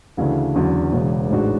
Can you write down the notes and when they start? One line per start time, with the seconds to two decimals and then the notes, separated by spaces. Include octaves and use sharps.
0.17 D2 C#3 E3 A3 D4
0.55 E2 D3 F#3 C#4 F#4
0.93 E1 E2 C#3 E3
1.30 A1 G#2 G#3 D4 F#4